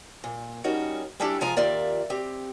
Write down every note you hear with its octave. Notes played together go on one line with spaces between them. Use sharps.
A#2
G3 C#4 D#4 F#4 A#4 C#5
G3 C#4 D4 E4 G4 A4
C3 F3 G#3 F4 G#5 A#5
D#2 F4 A#4 D5 E5
C4 G4